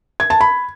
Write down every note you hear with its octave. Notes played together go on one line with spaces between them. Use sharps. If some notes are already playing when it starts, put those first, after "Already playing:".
G#6
A5
B5